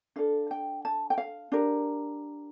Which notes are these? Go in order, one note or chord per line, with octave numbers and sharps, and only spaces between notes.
D4 A4 F5
G5
A5
G5
F5
D4 G4 A#4